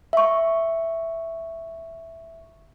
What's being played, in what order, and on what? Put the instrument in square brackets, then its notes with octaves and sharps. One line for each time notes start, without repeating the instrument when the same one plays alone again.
[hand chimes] E5 C#6